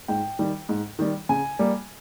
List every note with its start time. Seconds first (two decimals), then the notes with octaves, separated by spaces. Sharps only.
0.08 G#2 G5
0.39 D#3 G3
0.69 G#2
0.99 D#3 G3
1.29 C#3 G#5
1.59 G3 A#3